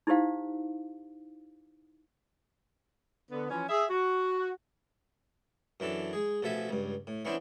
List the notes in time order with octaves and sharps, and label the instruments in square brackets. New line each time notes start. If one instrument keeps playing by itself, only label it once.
[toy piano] D#4 E4 G4 C5 F5
[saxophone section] D3 B3
E3 F3 C#4
G#4 E5
F#4
[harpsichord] F#2 E3 D4 A4
G#3 G#4
A1 B2 F3 A4 E5 G#5
C#2 G2
A2
E3 B3 C#4 D4 E4 C5